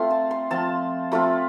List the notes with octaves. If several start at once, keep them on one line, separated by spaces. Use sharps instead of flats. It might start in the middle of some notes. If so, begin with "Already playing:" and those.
Already playing: A3 C4 F4 C6
A5
C6
F3 C4 F4 A5
F3 A3 C4 F4 B5